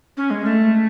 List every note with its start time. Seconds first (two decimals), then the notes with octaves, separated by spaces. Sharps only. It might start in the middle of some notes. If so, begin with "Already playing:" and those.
0.17 C#4
0.31 G#3
0.44 A3